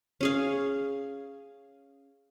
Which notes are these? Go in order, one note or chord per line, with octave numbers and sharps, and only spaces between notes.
C#4 G#4 F5